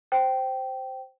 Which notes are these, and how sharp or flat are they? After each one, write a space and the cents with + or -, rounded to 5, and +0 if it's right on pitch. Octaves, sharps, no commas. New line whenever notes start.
C5 +0 G5 -15